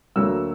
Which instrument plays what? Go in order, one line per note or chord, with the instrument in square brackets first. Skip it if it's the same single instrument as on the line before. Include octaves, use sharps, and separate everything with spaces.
[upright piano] D2 D3 F#3 A#3 E6